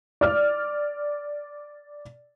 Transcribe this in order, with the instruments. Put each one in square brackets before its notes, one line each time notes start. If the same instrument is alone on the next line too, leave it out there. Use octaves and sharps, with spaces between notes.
[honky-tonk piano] D5 F6